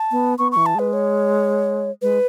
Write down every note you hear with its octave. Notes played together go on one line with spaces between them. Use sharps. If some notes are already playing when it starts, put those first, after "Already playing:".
Already playing: A5
B3
B3 C#6
E3 C#6
A5
G#3 B4
C#5
G#3 B4